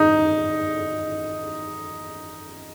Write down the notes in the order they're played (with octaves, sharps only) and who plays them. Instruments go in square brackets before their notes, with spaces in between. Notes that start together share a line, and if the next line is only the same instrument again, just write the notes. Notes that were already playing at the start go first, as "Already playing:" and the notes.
Already playing: [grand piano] D#4